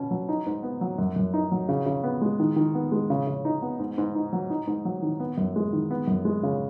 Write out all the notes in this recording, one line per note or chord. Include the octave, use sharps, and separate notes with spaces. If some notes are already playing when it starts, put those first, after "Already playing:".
Already playing: B2 C#4
F#3
D#4
G#2
B3
F#3
F#2
F#2
D#4
F#3
C#3
C#3
B3
G#3
D#3
D#3
B3
G#3
C#3
C#3
D#4
B3
G#2
G#2
D#4
F#3
D#4
G#2
F#3
D#3
B3
F#2
G#3
D#3
B3
F#2
G#3
C#3